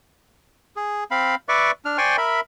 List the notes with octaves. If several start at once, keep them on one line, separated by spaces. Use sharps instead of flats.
G#4
C4 F5 B5
B4 D5 E5 C#6 D6
D4 F6
C5 D5 G5 G#5 C6 C#6
A#4 E5 B5